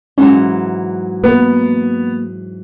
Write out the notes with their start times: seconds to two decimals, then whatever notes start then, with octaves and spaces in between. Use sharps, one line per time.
0.18 G#2 E3 F#3 C#4
1.24 A#3 B3